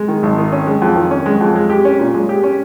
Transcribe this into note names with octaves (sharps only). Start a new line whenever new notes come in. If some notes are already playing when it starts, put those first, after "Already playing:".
Already playing: G#3
D#3
G#1
D#3
C#4
G#3
F2
D#3
C#4
G#3
F2
G#3
G4
C#4
A#2
G#3
G4
C#4